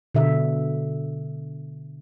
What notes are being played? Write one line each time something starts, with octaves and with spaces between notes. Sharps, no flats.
B2 D3 E5